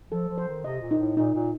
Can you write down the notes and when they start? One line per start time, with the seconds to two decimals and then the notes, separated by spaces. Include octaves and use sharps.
0.11 F3 A4
0.29 F3
0.38 C5
0.47 D#3
0.65 C3 D#5
0.81 A#2
0.91 D#4
0.99 A2
1.17 A#2 D#4
1.35 A#2